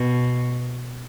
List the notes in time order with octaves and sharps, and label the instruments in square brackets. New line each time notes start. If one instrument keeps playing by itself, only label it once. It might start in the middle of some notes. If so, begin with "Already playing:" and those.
Already playing: [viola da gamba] B2